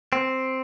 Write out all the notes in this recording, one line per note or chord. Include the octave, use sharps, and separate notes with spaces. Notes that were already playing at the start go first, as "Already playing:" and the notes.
C4